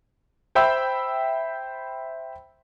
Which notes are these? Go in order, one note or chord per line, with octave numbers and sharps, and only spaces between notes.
C5 E5 G5 B5 E6